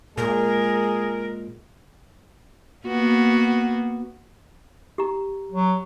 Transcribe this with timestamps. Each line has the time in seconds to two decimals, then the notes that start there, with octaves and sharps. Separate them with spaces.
0.18 A#2 G#3 G#4 A#4
2.87 A#3 B3 F#4
4.98 G4 A#5
5.52 F#3